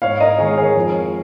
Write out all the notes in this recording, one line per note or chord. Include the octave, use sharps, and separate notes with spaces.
G#2 C#5 F5
A#4 D#5
D#3 G#3 G#4 C#5
G#4 C#5
F2